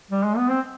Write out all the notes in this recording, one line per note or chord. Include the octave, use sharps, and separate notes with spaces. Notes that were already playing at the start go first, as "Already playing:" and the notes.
G3
G#3
B3
C4